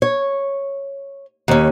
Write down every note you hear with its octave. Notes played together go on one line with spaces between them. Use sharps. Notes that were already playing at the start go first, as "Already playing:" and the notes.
C#5
D#2 C#4